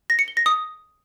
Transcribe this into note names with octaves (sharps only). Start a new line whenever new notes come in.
A#6
C#7
G7
A#6
D#6